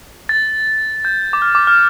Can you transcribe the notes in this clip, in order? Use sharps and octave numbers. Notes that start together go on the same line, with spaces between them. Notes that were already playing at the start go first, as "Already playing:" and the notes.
A6
G6
D6
F6
D6
F6